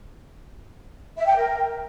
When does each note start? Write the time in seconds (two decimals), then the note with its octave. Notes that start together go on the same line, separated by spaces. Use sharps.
1.17 E5
1.26 G5
1.36 A#4